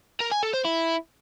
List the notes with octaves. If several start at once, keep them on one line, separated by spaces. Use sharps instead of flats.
A#4
G#5
A4
C5
E4